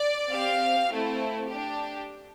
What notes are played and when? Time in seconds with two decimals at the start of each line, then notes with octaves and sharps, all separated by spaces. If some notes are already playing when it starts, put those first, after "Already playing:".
Already playing: D5
0.31 C4 G4 F5
0.90 A3 C4 E4
1.49 D4 G4